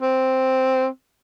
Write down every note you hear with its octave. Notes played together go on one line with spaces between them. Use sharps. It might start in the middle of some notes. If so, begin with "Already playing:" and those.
C4